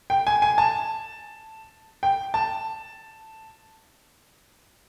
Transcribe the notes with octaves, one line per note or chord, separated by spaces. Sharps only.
G5
G#5
G#5
A5
G5
A5